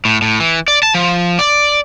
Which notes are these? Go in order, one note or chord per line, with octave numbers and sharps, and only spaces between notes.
A2
A2
E3
D5
A5
F3
D5